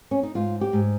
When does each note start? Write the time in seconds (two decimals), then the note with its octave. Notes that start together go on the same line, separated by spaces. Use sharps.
0.11 C#4
0.23 D#4
0.35 G#2 F4
0.61 G4
0.73 G#2